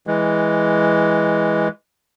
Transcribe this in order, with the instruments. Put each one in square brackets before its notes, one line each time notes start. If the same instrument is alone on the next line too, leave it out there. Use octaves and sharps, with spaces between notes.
[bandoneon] E3 G#3